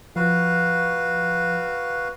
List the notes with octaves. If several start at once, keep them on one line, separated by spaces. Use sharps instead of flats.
F3 F#4 B4 F5